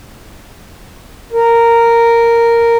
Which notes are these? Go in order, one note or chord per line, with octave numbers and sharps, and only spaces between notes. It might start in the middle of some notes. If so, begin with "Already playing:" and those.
A#4